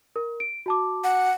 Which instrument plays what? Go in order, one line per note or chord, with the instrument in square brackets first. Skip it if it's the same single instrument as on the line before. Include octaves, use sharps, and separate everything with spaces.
[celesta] A#4
D7
F#4 A5 D6
[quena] F#5